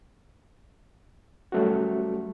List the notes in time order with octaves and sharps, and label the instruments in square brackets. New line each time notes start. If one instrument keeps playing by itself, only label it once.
[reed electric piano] F#3 G3 A3 C#4 F#4